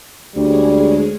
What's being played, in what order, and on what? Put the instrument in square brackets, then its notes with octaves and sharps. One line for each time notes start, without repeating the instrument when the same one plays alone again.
[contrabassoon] D2 [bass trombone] G3 [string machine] G#3 C#4 G#4